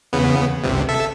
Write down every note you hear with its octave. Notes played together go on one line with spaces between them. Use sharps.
E2 C#3 B3
G1 C#2 C3
A4 E5